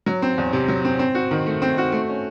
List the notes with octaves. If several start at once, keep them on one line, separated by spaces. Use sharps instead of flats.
F#3
C4
E2
C3
F#3
C4
C4
F#4
D#3
A3
C4
F#4
A3
C#4